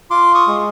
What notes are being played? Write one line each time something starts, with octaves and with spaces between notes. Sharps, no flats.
F4 C6 D6
C#6 D#6
G#3